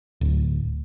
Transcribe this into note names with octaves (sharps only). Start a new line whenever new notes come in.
D1